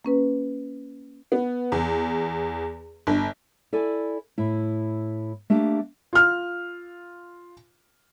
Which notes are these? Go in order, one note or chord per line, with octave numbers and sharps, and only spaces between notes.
A#3 C#4 B4
B3
E2
G1
E4 A4 D5 G#5
A2 E4
A3 A#3 D4 G4
F4 F6